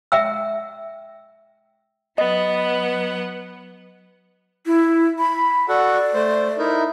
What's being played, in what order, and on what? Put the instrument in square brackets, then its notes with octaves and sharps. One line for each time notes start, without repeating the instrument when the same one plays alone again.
[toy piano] E5 F#5 G5 E6
[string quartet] F#3 B3 F#5 [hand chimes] D#5
[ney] E4
B5
[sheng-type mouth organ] F#4 A4 F#5 [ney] D5
[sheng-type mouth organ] A3 C5
D#4 E4 A#4